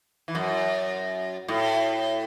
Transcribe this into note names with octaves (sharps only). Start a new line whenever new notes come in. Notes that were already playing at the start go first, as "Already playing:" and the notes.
E3
F#2
A2